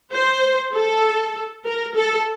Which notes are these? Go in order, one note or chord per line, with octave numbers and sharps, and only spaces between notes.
C5
A4
A#4
A4